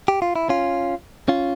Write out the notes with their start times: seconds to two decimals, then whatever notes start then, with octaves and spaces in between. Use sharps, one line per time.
0.08 G4
0.22 F4
0.36 E4
0.49 C#4 F4
1.28 C#4 F4